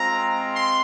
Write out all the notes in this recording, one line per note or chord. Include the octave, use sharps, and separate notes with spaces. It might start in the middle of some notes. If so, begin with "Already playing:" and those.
Already playing: G#3 C4 F4 A#5
C6